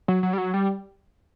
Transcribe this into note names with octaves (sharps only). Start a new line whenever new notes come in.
F#3
F#3
G3
F#3
G3